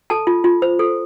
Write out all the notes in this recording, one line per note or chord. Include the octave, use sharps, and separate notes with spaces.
A4 A5
F4
F4
C5
A4